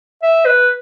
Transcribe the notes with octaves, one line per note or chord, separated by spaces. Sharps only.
E5
B4